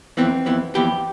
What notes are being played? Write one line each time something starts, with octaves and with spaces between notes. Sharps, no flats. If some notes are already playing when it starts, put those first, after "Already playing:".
F2 E3 B3 C4
F2 E3 B3
F2 E3 B3 G4